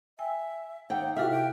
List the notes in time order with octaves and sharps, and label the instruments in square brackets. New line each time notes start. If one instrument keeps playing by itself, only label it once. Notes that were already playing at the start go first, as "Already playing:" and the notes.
[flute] E5 [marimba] G5 G#5 E6
[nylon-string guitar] D#2 G5 [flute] F#5
[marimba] C3 E4 A4 [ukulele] F#4 G4 F5 [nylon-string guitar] E5 [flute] F6
[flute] G5